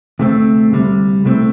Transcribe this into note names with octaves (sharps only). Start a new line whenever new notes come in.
D2 C3 A3 C4
D2 C3 G3
C2 C3 A3 C4